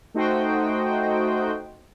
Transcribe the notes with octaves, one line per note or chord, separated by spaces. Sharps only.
A3 D#4 F#4 C5 D#5 G5